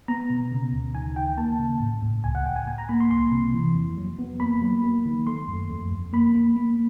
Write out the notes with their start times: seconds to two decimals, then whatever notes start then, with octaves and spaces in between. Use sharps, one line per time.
0.08 B3 A#5
0.30 B2
0.52 C#3
0.72 D2
0.94 D#3 G#5
1.16 D#3 G5
1.37 A#3 A5
1.59 C#3
1.80 A2
2.02 A2
2.24 C#2 G#5
2.35 F#5
2.46 C#2 G5
2.56 G#5
2.67 A2 G#5
2.78 A#5
2.89 A#3 B5
3.00 C6
3.11 C2 C6
3.32 C3
3.54 E3
3.75 F2
3.97 F#3
4.19 B3
4.40 A#3 B5
4.62 F#3
4.83 A#3
5.06 D#3
5.27 A3 C6
5.48 F#2
5.70 F2
5.91 F2
6.13 A#3 B5
6.35 A#3
6.56 A#3